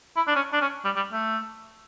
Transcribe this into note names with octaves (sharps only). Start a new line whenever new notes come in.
E4
D4
C#4
D4
C#4
G3
G3
A3